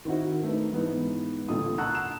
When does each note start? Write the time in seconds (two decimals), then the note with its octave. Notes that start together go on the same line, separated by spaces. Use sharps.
0.05 D#3 C4 D#4 E4 F#4
0.43 A3 D4 D#4 B4
0.73 G#2 E3 B3 D#4
1.48 A1 A#2 D3 A4 D#6
1.78 F#5 A5 A#5 C#6 E6 F#6
1.95 E7